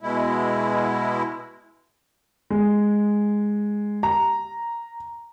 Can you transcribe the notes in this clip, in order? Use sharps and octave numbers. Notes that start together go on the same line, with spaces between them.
B2 G#3 E4
G#3
A#5